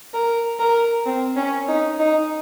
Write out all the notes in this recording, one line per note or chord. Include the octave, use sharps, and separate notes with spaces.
A#4
A#4
C4
C#4
D#4
D#4